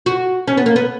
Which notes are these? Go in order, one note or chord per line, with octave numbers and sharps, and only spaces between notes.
F#4
C#4
B3
A#3
B3